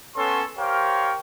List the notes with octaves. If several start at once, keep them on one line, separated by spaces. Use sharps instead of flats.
B3 C#4 A4 C#5 C6
G4 A#4 C5 C#5 F5 G5